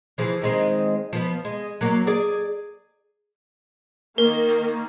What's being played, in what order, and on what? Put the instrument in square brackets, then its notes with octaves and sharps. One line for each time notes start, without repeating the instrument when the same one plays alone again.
[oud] E3 F3 G#4
D#3 G#3 C4
F3 B3
G#3
F#3 A#3
G#4 D5
[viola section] D#3 A#3 [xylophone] A#4